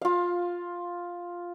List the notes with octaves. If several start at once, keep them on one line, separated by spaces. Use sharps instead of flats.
F4 F5